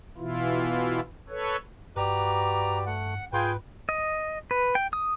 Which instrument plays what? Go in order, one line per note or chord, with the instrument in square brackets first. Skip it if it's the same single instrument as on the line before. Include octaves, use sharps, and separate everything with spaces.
[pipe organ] B2 E3 E4 F4
A4 B4 C#5
[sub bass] G2 [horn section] F#4 B4 D5 [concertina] G4 [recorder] A#5
[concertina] A3 [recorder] F#5
[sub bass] G#2 [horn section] F4 G5 [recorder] G#4 [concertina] B4
[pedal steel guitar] D#5
B4
G5
D#6